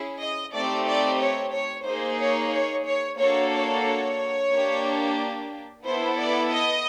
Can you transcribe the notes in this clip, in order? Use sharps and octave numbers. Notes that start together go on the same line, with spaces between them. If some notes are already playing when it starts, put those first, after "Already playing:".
Already playing: C#4 E4 G#4
D#5
A3 C4 D#4 G4 D5
D5
C#5
C#5
A#3 D#4 G#4 C5
C#5
C#5
C#5
A#3 D4 F#4 A4 C#5
C#5
C#5
A#3 D4 G4
B3 E4 A4 C5
D5
D#5